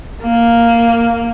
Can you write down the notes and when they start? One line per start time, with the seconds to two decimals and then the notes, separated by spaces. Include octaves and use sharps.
0.22 A#3